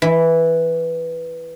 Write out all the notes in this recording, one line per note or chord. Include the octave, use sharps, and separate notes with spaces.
E3